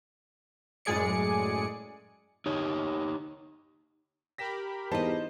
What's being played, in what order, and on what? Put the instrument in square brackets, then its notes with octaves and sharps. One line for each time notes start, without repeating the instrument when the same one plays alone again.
[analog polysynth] F#2 A2 G#3 G#4 D5 C#7
[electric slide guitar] D#4 G4 C#5
[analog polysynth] G4 A#4 B5 [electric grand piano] A#6 B6 E7
[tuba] E2 [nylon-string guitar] D#4 D#5 [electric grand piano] C5 A5